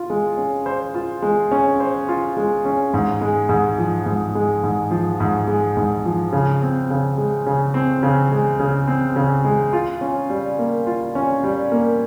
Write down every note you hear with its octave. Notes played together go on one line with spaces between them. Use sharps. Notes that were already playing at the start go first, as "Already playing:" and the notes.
Already playing: F4
G#3
C#4
C5
F4
G#3
C#4
C5
F4
G#3
C#4
G#2
G#3
G#2
F3
G#2
G#3
G#2
F3
G#2
G#3
G#2
F3
C#3
C4
C#3
G#3
C#3
C4
C#3
G#3
C#3
C4
C#3
G#3
F4
C#4
G3
A#3
F4
C#4
G3
A#3